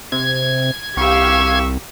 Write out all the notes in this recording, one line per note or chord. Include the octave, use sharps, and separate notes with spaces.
C3 G#6
C2 G4 F5 C#6 E6